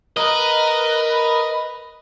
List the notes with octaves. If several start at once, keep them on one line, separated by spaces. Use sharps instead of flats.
A#4 B4 D#5 A#5